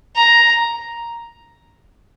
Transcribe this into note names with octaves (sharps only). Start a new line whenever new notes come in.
A#5